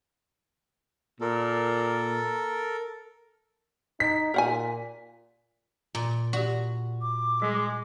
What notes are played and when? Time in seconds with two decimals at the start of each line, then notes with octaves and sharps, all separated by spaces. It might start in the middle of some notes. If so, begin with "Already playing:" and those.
1.21 A#2 A4 A#4
4.00 D#4 B6
4.34 A#2 A#4 F#5 G#5
5.95 A#2
6.33 F#4 G4 D5
7.02 D6
7.42 G3 G#3